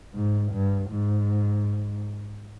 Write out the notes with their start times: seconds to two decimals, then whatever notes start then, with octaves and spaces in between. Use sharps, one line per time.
0.14 G#2
0.52 G2
0.90 G#2